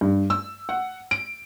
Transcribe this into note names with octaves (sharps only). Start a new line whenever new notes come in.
G2
E6
F#5
D7